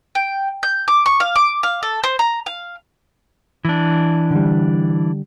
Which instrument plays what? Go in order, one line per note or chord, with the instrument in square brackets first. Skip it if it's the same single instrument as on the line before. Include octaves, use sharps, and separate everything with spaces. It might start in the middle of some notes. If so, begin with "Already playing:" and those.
[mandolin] G5
G6
D6
C#6
F5
D6
F5
A4
C5
A#5
F5
[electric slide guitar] E3 D4
[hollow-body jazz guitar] D3 G3